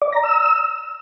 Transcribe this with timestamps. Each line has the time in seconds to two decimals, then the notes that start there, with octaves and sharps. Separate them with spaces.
0.02 D5
0.12 A#5
0.23 E6